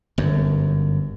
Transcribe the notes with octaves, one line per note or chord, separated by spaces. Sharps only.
G1 F#2